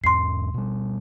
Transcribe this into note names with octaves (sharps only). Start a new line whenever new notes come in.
E2 G#2 C6 C7
B2 G3